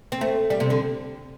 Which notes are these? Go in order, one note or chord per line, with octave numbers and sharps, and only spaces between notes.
C4
A3
G3
C3
D3